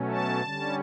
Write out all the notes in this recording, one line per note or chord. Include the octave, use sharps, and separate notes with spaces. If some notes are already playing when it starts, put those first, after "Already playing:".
Already playing: B2 F#3 A3 C#4
A5
D3 G3 C#4